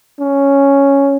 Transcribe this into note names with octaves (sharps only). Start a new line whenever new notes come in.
C#4